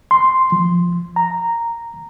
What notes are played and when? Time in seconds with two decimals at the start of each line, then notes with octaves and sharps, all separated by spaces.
0.11 C6
0.52 F3
1.16 A#5